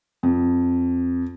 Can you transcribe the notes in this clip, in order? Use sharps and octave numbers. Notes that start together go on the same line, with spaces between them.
F2